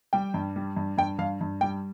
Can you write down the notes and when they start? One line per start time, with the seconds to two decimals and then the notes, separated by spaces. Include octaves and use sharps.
0.13 G3 G5
0.34 G2
0.56 G3
0.77 G2
0.98 G2 G5
1.18 G2 F5
1.41 G2
1.61 G3 G5